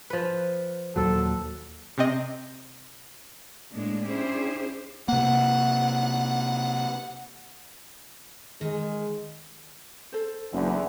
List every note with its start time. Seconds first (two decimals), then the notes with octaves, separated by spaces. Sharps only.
0.10 F3 B4
0.96 D#2 A#2 F#3 A4
1.98 C3 C4 D#5
3.72 A2 G#3 A#3 D4
4.05 C#4 D4 E4 G4 G#4 C5
5.08 C3 A#3 F#5
8.61 D#3 G#3
10.12 A4 C5
10.52 F#1 E2 D3